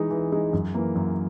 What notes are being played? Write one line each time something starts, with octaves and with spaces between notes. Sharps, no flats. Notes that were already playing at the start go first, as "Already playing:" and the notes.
Already playing: E3 G#3 D#4
E3
G#3 D#4
F#2
E3 A#3
F#2